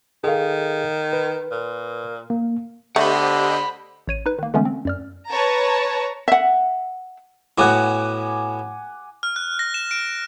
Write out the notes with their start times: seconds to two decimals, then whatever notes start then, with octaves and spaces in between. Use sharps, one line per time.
0.24 D#3 G#4 A4 F5
1.13 B4
1.51 A#2
2.30 A#3
2.96 D3 A3 G4 C5 D#5 F#5 B5
4.07 A1 C#5 D#7
4.26 D#4 B4
4.39 D#3 A#3
4.54 D3 E3 G#3 A3 B3 C#4
4.65 C4
4.85 F#2 D5 F6
5.28 B4 C#5 A5 A#5
6.28 E5 F#5
7.58 A2 B3 F#4 F#5 G#5 D6
9.23 F6
9.36 F#6
9.59 A#6
9.74 E7
9.91 D7